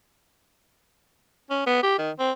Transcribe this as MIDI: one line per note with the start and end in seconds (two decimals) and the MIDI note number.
1.50 1.67 61
1.67 1.82 59
1.83 1.96 67
1.98 2.11 51
2.19 2.32 60